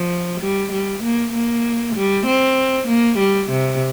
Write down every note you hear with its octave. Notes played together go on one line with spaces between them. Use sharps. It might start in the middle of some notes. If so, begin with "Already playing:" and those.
Already playing: F3
G3
G3
A#3
A#3
G3
C4
A#3
G3
C3